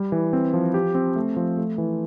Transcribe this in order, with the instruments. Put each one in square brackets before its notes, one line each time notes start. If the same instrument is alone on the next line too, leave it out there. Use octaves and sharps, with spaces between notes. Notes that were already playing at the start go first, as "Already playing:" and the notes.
Already playing: [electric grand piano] G3
E3
C4
F3
G4
C4
A3
F3
A3
E3